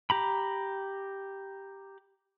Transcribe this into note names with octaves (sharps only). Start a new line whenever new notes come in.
G4 A#5 B5